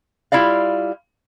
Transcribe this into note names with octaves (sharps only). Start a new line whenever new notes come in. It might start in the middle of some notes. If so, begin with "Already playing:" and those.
G3 E4 F4 D5 F5